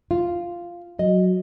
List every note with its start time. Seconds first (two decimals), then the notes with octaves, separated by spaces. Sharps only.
0.11 F4
0.99 F#3 D#5